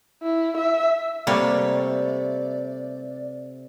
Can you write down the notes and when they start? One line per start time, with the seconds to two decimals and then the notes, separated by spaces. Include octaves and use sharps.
0.22 E4
0.57 E5
1.27 C3 G3 A3 A#3 C#5 D5